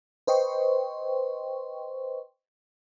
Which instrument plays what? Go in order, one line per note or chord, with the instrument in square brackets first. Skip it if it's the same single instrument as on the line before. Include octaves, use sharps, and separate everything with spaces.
[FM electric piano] B4 C5 D#5 G5 C6 C#6